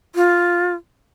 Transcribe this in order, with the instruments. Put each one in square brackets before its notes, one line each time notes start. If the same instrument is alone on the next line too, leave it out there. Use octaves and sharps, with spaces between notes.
[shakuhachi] F4